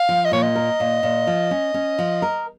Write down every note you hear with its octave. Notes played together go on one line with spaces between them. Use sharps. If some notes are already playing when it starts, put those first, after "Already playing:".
Already playing: F5
F3
D#5
A#2 C#5
D#5
A#4
A#2
A#2
F3
C#4
C#4
F3
A#4